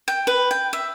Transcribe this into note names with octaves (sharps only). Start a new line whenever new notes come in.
G5
B4
G5
E5